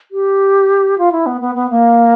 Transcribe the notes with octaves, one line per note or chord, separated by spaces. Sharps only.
G4
F4
E4
B3
B3
B3
A#3